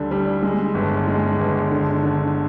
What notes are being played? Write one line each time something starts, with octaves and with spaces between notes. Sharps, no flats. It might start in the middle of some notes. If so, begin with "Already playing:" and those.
Already playing: D2 D3 G3
G3
G#3
G1
G#3
G1
D3
D3